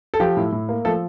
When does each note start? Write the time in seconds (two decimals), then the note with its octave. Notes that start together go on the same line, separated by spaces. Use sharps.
0.14 A4
0.20 F3 G4
0.37 A2
0.52 A2
0.69 A#3
0.85 F3 A3 A4